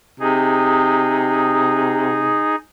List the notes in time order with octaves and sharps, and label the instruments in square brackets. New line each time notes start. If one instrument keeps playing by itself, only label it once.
[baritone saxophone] C3 [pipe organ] D#4 G#4